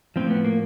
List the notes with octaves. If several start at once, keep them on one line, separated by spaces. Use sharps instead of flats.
A2 F3 C4
B3
A#3